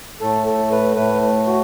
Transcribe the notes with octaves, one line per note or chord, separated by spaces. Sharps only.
A2 A3 A4
A4
B4
A2 A3 B4
F#4